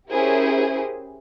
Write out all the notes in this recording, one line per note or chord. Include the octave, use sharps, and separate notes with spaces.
C#4 E4 G4 G#4 A#4 C5